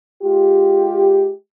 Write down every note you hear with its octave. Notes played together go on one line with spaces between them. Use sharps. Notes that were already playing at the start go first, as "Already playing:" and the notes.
G#3 F4 G4